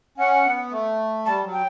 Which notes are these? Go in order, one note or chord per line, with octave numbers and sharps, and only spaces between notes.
C#4 F#5
B3
A3
G3 A5
F#3
G5